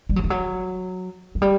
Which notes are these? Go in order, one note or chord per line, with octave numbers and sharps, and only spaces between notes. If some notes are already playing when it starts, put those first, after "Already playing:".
G3
F#3
F3
F#3
F#3
G3